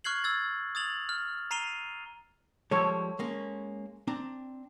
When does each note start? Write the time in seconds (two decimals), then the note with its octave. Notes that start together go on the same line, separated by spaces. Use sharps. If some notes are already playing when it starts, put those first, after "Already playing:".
0.04 C#6 F6 F#6 G#6 C7 F#7
0.24 E6 G#6 A6
0.75 D#6 G#6 A6 F7 F#7
1.09 F6
1.51 A#5 C7 D#7 F7 G7
2.71 F3 G3 G#3 A4 C#5
3.19 G#3 A#3 C#4
4.07 C4 D4 A#5